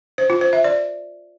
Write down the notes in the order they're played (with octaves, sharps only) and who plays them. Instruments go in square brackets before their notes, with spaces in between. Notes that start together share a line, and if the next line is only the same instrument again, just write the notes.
[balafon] C5
F4
C5
E5
D5